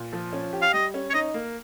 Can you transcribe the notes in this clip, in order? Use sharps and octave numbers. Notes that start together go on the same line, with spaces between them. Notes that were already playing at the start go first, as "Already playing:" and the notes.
Already playing: A#2
F3
C#4
G4
F5
G3 D#5
C#4
C#5
D#4 D#5
A#3